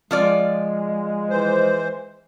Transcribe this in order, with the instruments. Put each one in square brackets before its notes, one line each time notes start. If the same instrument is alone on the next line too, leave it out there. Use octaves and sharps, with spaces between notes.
[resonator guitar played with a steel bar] F3 F4 D5 [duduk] G#3
[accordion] E3 C5